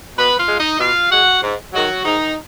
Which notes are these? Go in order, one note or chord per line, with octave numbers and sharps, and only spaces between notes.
B2 B3 B4
F4 F5
G#3
D#4 D#5
B2 F4 F5
G#3 F#4 F#5
G#2
D#3 F#3 G#3 F#4
G#2 D#3 D#4